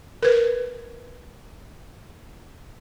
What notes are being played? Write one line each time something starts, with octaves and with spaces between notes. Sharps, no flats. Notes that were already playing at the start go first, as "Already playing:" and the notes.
A#4 B4